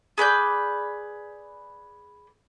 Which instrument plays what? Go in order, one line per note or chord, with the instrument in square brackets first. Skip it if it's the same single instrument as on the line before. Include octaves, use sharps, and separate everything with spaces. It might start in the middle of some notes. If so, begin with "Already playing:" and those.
[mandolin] G#4 B4 D5 G6